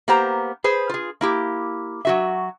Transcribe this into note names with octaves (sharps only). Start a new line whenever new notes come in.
A#3 B3 G4 C5 A#5
G#4 B4 C5
F4 G#4
A#3 E4 G4
F#3 F#4 E5